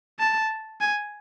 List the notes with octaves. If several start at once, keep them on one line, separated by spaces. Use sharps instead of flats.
A5
G#5